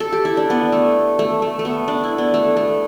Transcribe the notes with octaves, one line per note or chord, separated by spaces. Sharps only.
A4
G4
E4
D4
B3
A3
A3
A3
A3
B3
D4
E4
B3
A3
A3